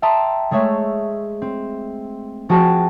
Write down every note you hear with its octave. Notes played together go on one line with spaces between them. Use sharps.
E5 G5 A5 A#5 C6 D#6
G#3 A3 G#4 C#5 E5
C4
F3 F#4 G#4 G5 A5 A#6